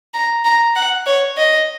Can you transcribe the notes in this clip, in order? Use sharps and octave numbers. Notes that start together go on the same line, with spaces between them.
A#5
A#5
F#5
C#5
D#5